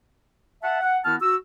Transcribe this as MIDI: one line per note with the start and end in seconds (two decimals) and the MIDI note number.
0.63 0.78 76
0.63 0.78 78
0.63 0.78 81
0.81 0.98 78
1.05 1.16 51
1.05 1.16 59
1.05 1.16 64
1.05 1.16 66
1.05 1.16 81
1.05 1.16 89
1.21 1.35 66
1.21 1.35 88